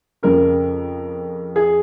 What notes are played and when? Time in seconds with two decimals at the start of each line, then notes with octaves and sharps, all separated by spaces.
0.23 F2 C#3 A#4
1.56 G#4